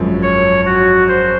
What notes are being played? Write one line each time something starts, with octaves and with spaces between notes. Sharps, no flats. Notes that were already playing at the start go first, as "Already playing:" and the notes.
Already playing: G#1 F#2 F3
C#5
F#4
C5